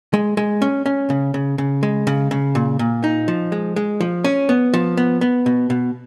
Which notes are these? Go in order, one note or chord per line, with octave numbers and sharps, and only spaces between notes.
G#3
G#3
C#4
C#4
C#3
C#3
C#3
G#3
C#3
C#3
A#2
A#2
D#4
F3
G#3
G#3
F3
C#4
B3
F3
B3
B3
B2
B2